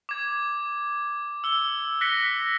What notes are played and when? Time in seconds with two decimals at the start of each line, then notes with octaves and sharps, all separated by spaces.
0.09 D6 G#6
1.44 E6 G7
2.01 F#6 A#6 B6 C#7 G7